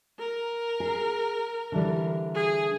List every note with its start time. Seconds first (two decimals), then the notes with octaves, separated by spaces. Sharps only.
0.19 A#4
0.80 G#4
1.72 D3 E3 G3
2.34 G#4